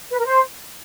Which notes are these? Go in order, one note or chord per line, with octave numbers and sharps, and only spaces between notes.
B4
A#4
C5